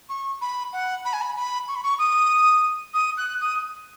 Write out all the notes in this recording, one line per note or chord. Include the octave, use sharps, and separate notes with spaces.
C#6
B5
F#5
B5
G#5
B5
B5
C#6
B5
C#6
D#6
D#6
F#6
D#6